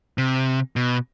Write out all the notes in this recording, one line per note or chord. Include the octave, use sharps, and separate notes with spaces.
C3
B2